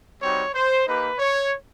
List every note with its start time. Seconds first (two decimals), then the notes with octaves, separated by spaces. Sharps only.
0.21 G3 C4 D#4 F#4 C#5
0.54 C5
0.87 A#3 D#4 G4 B4
1.19 C#5